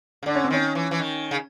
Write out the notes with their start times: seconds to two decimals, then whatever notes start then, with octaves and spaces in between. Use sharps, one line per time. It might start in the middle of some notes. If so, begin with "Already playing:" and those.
0.23 C#3
0.26 D3 D4
0.35 C#4
0.44 C4
0.50 D#3 C#4
0.75 E3
0.91 E3
1.00 D#3
1.31 C#3